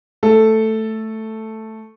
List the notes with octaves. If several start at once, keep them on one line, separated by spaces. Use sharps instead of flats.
A3 A4